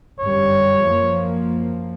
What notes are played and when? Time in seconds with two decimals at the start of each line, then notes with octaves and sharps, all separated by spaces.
0.20 G1 F#2 G3 C#5
0.84 F#2 F3 A#3